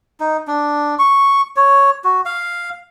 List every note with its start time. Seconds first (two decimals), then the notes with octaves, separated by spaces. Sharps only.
0.20 D#4
0.47 D4
0.99 C#6
1.56 C#5
2.04 F#4
2.25 F5